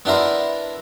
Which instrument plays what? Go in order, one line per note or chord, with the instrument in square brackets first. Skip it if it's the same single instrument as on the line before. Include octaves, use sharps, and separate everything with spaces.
[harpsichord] B3 D4 E4 A#4 C5